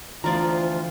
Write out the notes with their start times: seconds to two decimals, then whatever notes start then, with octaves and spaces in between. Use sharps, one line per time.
0.24 D2 E3 F3 F4 D5 A#5